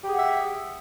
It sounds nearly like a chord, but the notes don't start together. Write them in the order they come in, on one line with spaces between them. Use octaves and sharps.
G4 G#4 F#5 E5